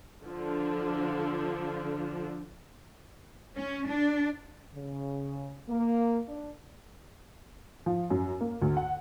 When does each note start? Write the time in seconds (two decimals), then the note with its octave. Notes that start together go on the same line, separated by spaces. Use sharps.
0.24 D3 F3 D4
3.55 C#4
3.86 D4
4.74 C#3
5.69 A#3
6.29 D4
7.86 F3
8.10 F#2
8.41 A#3
8.62 D2
8.77 F#5